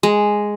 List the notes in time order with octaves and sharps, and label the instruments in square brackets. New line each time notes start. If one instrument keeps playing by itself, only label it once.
[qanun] G#3